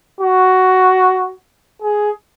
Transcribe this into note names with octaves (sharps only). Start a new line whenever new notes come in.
F#4
G#4